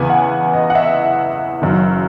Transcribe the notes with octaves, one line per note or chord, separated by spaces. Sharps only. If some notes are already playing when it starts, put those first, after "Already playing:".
Already playing: E2 C#3 E3 B3 G#5
F#5
D#5
F#5
E5
F#1 F#2 D#3